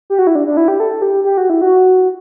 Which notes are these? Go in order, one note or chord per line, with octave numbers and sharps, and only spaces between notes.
G4
F#4
E4
D4
D4
E4
G4
A4
G4
G4
F#4
E4
F#4